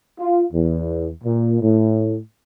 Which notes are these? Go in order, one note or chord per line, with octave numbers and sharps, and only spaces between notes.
F4
E2
A#2
A2